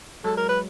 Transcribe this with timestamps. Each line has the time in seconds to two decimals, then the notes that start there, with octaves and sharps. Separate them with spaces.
0.24 F#3 G#3 A4
0.37 A#4
0.49 B4